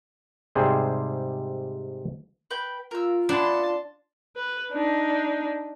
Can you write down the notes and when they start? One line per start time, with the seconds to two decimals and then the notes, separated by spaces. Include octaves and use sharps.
0.55 G#2 C3 G3 G#4 C5
2.51 B4 G5
2.91 F4 A#4 E6
3.29 B3 D4 E4 A5 C6
4.36 B4
4.72 D4 D#4